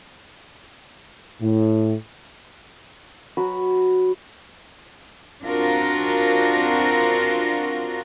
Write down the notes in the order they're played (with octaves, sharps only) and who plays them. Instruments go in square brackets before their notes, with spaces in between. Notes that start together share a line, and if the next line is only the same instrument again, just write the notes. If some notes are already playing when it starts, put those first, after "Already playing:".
[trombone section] A2
[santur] F#3 F#4 B4 B5
[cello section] C4 D4 F4 F#4 A#4